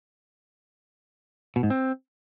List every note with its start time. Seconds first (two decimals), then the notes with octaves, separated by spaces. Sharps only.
1.56 B2
1.63 G#2
1.70 C4